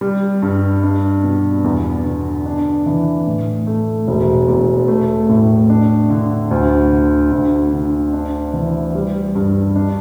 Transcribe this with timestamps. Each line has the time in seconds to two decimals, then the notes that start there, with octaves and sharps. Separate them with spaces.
0.01 G3
0.42 G2
0.83 D4
1.23 B2
1.64 E2
2.05 D3
2.46 D4
2.86 E3
3.27 A2
3.67 A3
4.08 E1
4.48 E2
4.88 A3
5.29 A2
5.70 D4
6.10 D3
6.51 D2
6.91 D3
7.32 D2
7.73 D3
8.13 D4
8.54 E3
8.95 G3
9.35 G2
9.76 D4